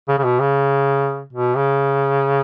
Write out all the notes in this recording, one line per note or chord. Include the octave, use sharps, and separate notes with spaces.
C#3
C#3
B2
C#3
B2
C#3